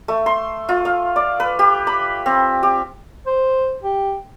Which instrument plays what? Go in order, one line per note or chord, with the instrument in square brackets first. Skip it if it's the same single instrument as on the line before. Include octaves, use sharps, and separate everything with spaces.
[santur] A3
C6
F4
F5
D5
B4
G4
B5
C4
G4
[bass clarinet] C5
G4